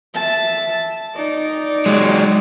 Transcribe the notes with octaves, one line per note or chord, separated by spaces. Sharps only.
E5 A5
D#4 D5
F#3 G#3